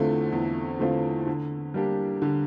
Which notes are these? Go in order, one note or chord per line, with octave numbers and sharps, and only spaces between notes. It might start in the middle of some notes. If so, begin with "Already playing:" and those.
Already playing: E2 D3 A3 C4 F4
E2
D3 A3 C4 F4
D3
G3 A#3 D4 G4
D3